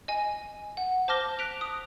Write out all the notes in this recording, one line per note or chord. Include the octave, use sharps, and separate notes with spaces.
D#5 G#5
F#5
C5 A5 D6 F6 A#6 G7
F#6 B6 D7 F7
D#6